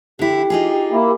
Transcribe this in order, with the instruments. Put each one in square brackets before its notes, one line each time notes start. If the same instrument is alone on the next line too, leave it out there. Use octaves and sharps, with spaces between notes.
[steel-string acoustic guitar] D3 E4 [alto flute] G4
[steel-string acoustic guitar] D#4 F4 G#4
[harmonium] A#3 E4